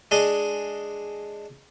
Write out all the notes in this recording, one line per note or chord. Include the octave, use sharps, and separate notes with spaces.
G#3 D4 D#5